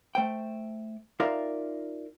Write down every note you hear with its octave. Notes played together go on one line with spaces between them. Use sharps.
A3 C5 G5
D#4 F4 A#4 D5 E5 F5